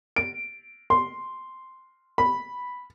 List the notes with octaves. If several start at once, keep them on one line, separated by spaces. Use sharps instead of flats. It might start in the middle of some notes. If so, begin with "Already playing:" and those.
D7
C6
B5